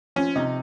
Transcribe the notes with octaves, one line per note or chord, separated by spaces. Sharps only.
F3 C#4
C3 D#4